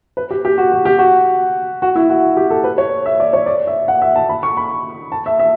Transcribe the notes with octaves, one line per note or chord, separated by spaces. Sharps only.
B4
G4
G4
F#4
F#4
G4
F#4
F#4
E4
F#4
G4
A4
B4
C#5
E5
D5
C#5
D5
E5
F#5
E5
A5
B5
C#6
B5
A5
E5
E5